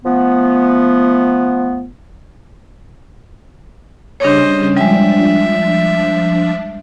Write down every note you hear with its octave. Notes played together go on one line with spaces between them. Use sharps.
F3 A3 B3
C#3 G3 C#4 D4 C5 C#5 D#5
F3 G3 G#3 D4 E5